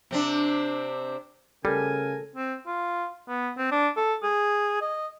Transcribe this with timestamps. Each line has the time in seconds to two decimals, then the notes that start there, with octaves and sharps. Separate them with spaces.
0.11 C3 C4 D4
1.65 C#3 G3 A4 A#4 G#5
2.36 C4
2.67 F4
3.28 B3
3.57 C4
3.72 D4
3.97 A4
4.23 G#4
4.81 D#5